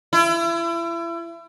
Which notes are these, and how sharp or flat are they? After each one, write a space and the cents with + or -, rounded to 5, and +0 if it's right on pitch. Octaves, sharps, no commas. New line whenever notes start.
E4 +35